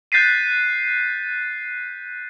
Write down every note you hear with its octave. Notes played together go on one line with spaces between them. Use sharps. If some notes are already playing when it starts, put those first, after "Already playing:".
F#6 G6 A6 B6 C7 D#7